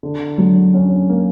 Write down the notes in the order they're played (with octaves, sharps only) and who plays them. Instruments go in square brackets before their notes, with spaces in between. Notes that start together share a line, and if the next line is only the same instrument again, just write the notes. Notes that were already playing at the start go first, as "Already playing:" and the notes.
[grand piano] D3
F#3
C#4
A#3